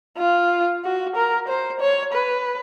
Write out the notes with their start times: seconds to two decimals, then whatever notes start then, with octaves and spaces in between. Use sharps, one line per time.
0.18 F4
0.84 F#4
1.16 A#4
1.48 C5
1.80 C#5
2.13 B4